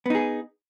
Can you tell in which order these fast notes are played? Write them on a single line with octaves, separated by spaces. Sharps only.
B3 D#4 G#4